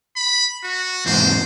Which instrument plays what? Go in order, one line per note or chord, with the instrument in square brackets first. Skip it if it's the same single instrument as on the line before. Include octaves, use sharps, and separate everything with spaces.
[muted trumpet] B5
F#4
[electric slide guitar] E2 G#2 C3 [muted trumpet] C5